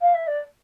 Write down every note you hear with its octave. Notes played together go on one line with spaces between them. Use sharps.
F5
E5
D5